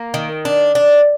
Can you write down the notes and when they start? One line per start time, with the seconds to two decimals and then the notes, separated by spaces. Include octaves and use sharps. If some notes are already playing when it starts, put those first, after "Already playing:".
Already playing: A#3
0.14 D#3
0.45 D4
0.75 D4